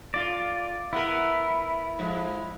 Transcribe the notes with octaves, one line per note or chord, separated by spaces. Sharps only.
A3 F4 D5
B3 E4 A#4
G#2 F3 G#3